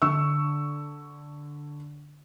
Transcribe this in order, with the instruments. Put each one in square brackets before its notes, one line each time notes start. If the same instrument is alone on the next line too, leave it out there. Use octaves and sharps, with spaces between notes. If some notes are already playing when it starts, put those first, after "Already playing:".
[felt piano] D3 C#6 E6